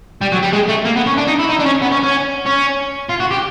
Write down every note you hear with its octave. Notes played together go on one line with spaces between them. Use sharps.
G3
F#3
G3
G#3
A3
A#3
B3
C#4
D4
D#4
E4
D#4
D4
C#4
B3
C#4
C#4
C#4
F4
F#4
G4